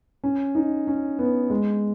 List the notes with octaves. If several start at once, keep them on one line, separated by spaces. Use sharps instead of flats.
C#4
D#4
C#4
B3
G#3